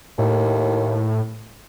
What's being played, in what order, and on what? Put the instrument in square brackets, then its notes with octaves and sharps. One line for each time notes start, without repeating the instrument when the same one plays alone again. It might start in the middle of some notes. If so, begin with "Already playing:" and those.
[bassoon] D#2 [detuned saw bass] A2